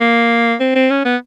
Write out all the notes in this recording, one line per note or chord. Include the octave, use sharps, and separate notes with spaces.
A#3
C4
C4
C#4
B3